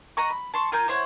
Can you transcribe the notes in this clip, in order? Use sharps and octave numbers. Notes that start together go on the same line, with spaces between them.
D#5 F#5 A#5 C#6
B5
A5 C6 C#6
F4 A#4 G#5 G6
E4 C5 C#5 F#5